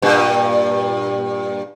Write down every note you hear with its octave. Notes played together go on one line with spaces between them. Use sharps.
G2 A#2